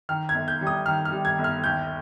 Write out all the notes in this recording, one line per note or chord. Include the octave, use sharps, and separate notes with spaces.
D#3 F6
G#6
G1
G6
G3
D#6
D#3 F6
F6
G3
G#6
G1
F6
D#2 G6